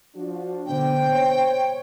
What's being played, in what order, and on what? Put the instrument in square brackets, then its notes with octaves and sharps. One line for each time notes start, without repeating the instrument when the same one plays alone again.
[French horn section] F3 D4 F#4
[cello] B2 D3 [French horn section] C5 [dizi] G5
[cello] C#5